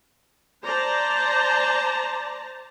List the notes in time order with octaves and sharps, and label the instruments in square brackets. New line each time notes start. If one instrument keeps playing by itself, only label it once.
[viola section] C5 D5 A5 A#5